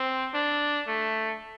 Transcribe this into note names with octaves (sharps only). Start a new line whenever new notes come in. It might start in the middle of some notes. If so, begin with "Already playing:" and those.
Already playing: C4
D4
A3